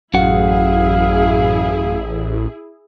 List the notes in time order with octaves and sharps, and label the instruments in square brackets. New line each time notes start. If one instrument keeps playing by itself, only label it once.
[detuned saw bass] A1 [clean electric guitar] F#2 F#4 F#5 [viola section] E4 G#4 [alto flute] F5